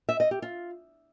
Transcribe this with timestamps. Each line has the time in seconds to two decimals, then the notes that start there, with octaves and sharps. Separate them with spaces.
0.09 E5
0.20 D#5
0.31 G4
0.42 F4